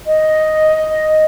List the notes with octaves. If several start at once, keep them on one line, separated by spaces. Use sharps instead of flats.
D#5